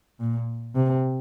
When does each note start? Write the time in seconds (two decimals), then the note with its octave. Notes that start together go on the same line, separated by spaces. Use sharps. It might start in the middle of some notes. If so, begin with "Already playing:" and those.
0.20 A#2
0.75 C3